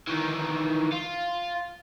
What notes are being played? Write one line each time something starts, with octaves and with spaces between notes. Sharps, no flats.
D#3 E3
F4